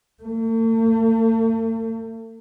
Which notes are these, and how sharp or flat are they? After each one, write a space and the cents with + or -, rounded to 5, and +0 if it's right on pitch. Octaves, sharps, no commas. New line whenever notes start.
A3 +45